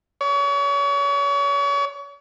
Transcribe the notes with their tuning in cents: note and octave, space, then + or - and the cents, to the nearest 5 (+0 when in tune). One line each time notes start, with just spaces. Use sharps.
C#5 +35